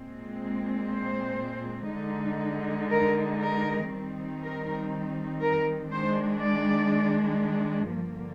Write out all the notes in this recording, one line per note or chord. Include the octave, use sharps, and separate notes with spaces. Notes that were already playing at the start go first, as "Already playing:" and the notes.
Already playing: A#2 G#3 C4
C5
D3 G#3 D#4
A#4
A#4
D#3 G3 C4 D#4
A#4
A#4
D#3 G#3 D4 C5
D5
G2 D3 F3 A#3